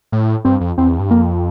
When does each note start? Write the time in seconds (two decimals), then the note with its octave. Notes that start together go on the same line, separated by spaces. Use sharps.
0.12 A2
0.45 G2 C4
0.61 F2
0.78 E2 C4
0.99 G2
1.11 F2 A#3